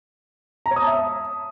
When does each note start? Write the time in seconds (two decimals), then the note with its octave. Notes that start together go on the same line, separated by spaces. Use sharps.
0.66 A#5
0.71 C#5
0.76 D#6
0.82 A5
0.87 E5